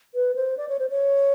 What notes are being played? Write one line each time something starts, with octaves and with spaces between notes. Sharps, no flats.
B4
C5
D5
C#5
C5
C#5